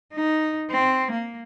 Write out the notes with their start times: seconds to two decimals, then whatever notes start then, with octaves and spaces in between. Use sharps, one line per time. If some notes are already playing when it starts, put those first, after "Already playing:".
0.14 D#4
0.71 C4
1.12 A#3